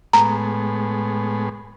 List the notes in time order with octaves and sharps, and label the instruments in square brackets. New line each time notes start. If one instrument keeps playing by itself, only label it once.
[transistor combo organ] A2 G#3 B3 [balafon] A#5